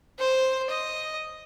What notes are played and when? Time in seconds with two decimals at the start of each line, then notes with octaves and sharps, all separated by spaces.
0.19 C5
0.70 D#5